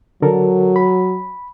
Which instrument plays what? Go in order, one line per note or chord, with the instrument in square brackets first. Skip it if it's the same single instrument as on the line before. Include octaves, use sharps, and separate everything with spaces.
[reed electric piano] D3 A4 A#4 [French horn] F#3
[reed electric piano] B5